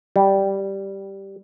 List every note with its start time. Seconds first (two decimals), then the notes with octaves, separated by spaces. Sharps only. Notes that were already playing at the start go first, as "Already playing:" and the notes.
0.16 G3